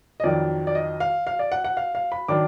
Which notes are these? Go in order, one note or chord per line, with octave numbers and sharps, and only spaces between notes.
D#5
F2 D#3 F#3 D5
D5
D#5
F5
F5
D5
F#5
F#5
F5
F5
B5
D#3 F#3 D4 D6